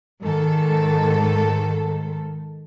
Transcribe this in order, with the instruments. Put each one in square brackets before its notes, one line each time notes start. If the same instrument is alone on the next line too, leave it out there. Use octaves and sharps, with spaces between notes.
[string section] G#2 D#3 A4